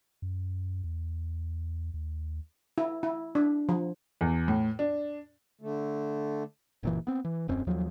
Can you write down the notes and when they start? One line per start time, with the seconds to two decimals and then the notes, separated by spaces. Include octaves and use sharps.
0.22 F#2
0.84 E2
1.94 D#2
2.78 E4
3.03 E4
3.35 D4
3.69 F3
4.21 E2
4.48 A2
4.79 D4
5.61 D3 A3
6.83 F#1 A#2 E3
7.07 B3 C4
7.25 E3
7.48 D#1 F#2 C4 C#4
7.67 D#2 F3 F#3